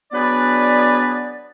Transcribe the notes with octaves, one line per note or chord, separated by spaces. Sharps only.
F#3 B3 D4 G#4 B4 D5